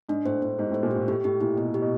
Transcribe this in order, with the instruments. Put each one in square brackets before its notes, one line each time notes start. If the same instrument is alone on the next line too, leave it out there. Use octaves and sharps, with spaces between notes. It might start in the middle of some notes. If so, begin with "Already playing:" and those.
[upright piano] G#2 [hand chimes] D4
[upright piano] A2 [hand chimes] C5
[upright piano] A2 [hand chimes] C5
[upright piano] G#2 [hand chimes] G4
[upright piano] A2
[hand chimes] C5
[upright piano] A#2
[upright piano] A2 [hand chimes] G4
[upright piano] A2 [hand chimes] G4
[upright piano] A2 [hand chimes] G4
[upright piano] A#2 [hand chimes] E4
[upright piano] B2 [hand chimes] E4
[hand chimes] G4
[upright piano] B2